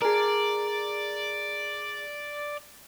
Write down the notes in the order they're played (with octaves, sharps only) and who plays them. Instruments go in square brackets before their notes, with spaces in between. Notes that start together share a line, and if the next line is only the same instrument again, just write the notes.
[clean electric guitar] G#4 A#4 [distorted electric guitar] D5